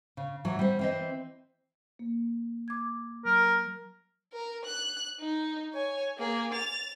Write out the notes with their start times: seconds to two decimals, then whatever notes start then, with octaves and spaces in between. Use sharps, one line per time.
0.17 C#3
0.45 E3 F#3
0.59 G3 C4
0.79 E3 C4 D#5
1.99 A#3
2.68 D6 G#6
3.25 F#3 A#4
4.33 A#4
4.65 F#6
5.20 D#4
5.73 C#5 G#5
6.18 A#3 G#4
6.53 A6 F7